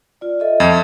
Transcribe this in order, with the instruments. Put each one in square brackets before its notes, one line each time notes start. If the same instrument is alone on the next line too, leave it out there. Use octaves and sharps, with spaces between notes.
[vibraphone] F4 D5
A4 D#5 E5
[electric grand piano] F2